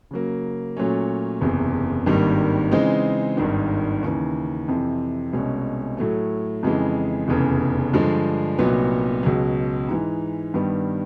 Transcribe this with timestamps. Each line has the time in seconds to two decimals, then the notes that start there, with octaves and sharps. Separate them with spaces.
0.11 C#3 F#3 A#3
0.77 A#2 F#3 A3 C#4
1.41 F#1 E2 C3
2.06 G#1 G2 D#3 G3 A#3
2.71 C#3 E3 G#3 C4 D#4
3.37 G#1 G2 D#3
4.03 D#2 C#3 E3
4.68 F2 C3 E3
5.33 C2 B2 G#3 C#4
5.97 A2 F#3 A3
6.63 F2 C#3 E3 G#3
7.28 F1 E2 C#3 E3
7.93 G2 D3 F3 G#3
8.58 C2 A#2 F#3 B3 D#4
9.23 C#2 B2 F#3
9.89 G#2 E3 G#3
10.54 G2 D#3 G3 B3